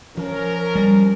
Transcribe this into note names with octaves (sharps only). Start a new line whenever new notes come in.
F3 C#4 A#4
G3